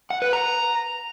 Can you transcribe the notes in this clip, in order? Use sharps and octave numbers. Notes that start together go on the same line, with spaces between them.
F#5
B4
A#5